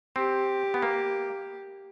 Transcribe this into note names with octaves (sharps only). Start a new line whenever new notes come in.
C4 G4
B3
A#3